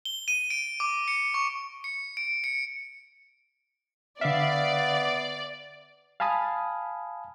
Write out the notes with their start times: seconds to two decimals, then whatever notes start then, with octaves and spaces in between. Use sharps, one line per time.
0.05 G7
0.28 D#7
0.50 D7
0.80 D6
1.08 C#7
1.34 C#6
1.84 C#7
2.17 D7
2.44 C#7
4.21 D3 B3 D5 E5 F5 F6 C7
6.20 F5 G#5 A5 B5 D#6